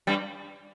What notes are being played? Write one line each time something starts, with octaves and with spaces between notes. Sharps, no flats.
G2 G3